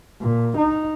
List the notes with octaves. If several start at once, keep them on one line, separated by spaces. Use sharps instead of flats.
A#2
D#4